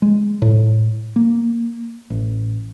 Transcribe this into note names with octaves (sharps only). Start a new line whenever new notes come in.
G#3
A2
A#3
A1